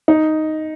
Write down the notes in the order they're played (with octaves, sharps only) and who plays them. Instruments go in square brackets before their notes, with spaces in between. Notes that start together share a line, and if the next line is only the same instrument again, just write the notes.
[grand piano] D#4